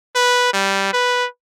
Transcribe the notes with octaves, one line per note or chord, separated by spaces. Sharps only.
B4
G3
B4